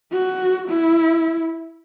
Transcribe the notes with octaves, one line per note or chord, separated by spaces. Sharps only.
F#4
E4